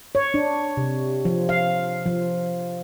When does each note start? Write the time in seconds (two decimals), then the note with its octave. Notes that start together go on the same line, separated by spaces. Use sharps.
0.15 C#5
0.34 D4
0.77 C3
1.25 F3
1.49 F5
2.06 F3